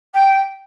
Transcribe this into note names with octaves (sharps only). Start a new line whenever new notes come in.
G5